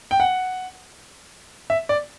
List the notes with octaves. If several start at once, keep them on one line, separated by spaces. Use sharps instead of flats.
G5
F#5
E5
D5